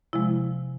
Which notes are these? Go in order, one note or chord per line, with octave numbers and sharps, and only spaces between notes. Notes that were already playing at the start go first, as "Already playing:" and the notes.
C3 F3 G#3 E4